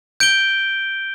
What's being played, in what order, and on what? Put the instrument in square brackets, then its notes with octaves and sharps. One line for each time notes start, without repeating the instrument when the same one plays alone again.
[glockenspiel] G6 D7 G7